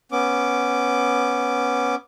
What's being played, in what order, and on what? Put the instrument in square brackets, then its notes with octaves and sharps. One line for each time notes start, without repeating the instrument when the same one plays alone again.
[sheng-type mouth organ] B3 C#4 D6